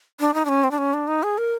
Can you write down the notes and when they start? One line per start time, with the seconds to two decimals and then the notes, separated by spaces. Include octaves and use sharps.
0.20 D4
0.34 D#4
0.45 D4
0.49 C#4
0.64 C4
0.71 D4
0.78 C#4
0.94 D4
1.07 D#4
1.23 G#4
1.38 A#4